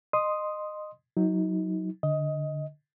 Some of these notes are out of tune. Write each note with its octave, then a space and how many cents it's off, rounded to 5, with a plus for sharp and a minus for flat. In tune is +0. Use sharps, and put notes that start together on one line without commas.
D#5 -20 C6 +0 D#6 +0
F#3 +0 D#4 +35
D3 +0 D#5 +15